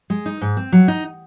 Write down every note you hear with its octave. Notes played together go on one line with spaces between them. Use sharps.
G#3
D#4
G#2
C4
F#3
D#4